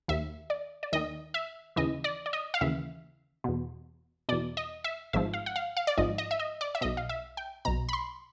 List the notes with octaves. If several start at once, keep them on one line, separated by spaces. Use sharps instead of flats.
D#2 D#3 E5
D5
D5
D#2 D#3 D#5
E5
D#2 C#3 E3 D#5
D5
D5
D#5
F5
D#2 C#3 E3 E5
E2 B2
E2 B2 D5
D#5
E5
G#1 G#2 F3 E5
F5
F#5
F5
F5
D5
G#1 G#2 F3 D#5
D#5
E5
D#5
D5
E5
B1 B2 D#5
F5
E5
G5
B1 B2 A#5
B5
C6